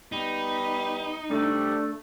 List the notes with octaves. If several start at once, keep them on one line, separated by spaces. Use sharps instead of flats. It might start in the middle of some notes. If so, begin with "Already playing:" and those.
G3 B3 D#4 B5
C3 G3 A3 D4